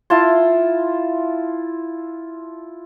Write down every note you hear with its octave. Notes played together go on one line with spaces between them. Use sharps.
E4 F4 A5 C6